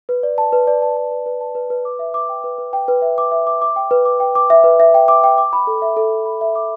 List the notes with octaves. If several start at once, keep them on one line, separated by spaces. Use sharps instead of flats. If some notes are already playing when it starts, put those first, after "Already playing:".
B4
D5
A5
B4
D5
A5
A5
B4
B4
A5
B4
B4
D6
E5
D6
G5
B4
B4
G5
B4
E5
D6
E5
D6
D6
G5
B4
D6
G5
D6
E5
B4
E5
G5
D6
G5
D6
B5
A4
E5
A4
A4
B5
E5
D6